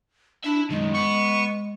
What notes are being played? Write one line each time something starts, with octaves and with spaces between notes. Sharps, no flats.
D4 E4 E5
F#2 D#3 G#3
B3 C#6